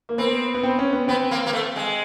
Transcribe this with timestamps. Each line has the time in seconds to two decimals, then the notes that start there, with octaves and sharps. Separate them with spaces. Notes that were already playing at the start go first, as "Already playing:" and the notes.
0.09 A#3
0.18 B3 C4
0.55 B3
0.63 C4
0.79 C#4
0.93 B3
1.08 B3 C4
1.31 A#3
1.46 A#3
1.53 A3
1.76 G#3